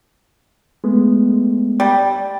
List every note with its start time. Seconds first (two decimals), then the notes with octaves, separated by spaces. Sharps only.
0.84 G#3 A3 B3
1.80 G3